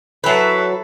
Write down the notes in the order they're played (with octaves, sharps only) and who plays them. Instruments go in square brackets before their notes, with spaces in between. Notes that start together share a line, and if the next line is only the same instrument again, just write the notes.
[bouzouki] F#3 B4 [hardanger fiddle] E4 A4